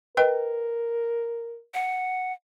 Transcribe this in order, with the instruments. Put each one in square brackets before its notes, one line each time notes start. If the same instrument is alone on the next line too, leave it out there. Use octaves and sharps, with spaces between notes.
[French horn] A#4 [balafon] B4 D#5 G5
[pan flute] F#5